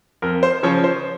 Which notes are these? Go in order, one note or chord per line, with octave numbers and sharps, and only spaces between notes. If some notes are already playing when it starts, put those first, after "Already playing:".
F2 A#4
C5
C#3 F3 C#5
C5